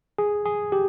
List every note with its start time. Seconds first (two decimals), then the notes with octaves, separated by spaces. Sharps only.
0.18 G#4
0.45 G#4
0.72 G4